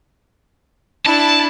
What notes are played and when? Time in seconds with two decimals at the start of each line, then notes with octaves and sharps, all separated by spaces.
1.06 D4 E4 A5 B5